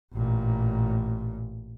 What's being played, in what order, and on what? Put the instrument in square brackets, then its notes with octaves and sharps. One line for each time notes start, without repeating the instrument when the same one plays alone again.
[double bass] A1 A#2